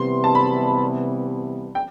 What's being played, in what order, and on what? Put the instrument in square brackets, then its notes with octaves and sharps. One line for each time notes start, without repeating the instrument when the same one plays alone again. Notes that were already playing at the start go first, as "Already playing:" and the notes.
Already playing: [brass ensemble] C3 E3 G3 B3 [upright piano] C6
[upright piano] A5
B5
G5